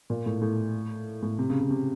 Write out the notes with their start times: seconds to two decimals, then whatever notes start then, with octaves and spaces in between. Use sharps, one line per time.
0.10 A#2
0.26 A2
0.41 A2
1.22 A2
1.39 C3
1.50 C#3
1.61 C#3
1.71 C3